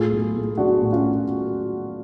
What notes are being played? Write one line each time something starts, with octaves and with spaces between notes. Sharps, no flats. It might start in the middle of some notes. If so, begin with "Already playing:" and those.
Already playing: A2 F4 G#4
B1
A2
B1 D4 F#4
A2
C#4 F4